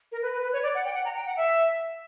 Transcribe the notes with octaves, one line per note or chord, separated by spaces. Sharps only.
A#4
B4
B4
B4
C#5
D5
F#5
G5
F#5
A#5
G5
F#5
E5